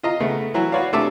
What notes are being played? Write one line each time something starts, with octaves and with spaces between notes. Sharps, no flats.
F4 D#5 A#5
C#3 A3 B3
E3 F#3 F#4
F#4 B4 C#5 D5 F5
C3 A3 D4 A5 D6 E6